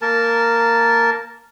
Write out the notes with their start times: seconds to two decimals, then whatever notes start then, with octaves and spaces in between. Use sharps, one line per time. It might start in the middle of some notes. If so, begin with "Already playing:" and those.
0.02 A#3 A#4 A5